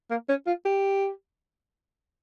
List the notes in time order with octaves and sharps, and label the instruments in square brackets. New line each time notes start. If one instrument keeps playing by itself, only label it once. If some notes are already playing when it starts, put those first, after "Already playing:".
[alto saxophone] A#3
C#4
F4
G4